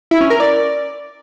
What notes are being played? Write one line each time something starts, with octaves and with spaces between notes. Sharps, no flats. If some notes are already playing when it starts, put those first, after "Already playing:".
E4
C#4
A#4
D5